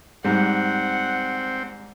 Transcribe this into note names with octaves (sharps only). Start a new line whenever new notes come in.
G#2 G3 C4 F#5